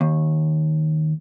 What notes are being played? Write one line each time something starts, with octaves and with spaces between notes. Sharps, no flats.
D#2